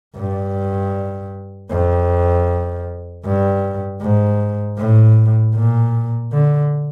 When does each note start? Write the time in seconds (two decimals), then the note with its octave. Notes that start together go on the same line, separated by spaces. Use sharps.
0.17 G2
1.70 F2
3.25 G2
4.01 G#2
4.78 A2
5.54 A#2
6.32 D3